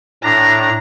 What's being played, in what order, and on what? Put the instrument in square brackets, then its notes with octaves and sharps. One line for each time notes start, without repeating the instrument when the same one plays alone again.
[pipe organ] A2 D4 A#6 [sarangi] A#5